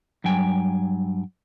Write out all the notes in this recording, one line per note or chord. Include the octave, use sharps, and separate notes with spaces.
G2 F#3 G5 G#5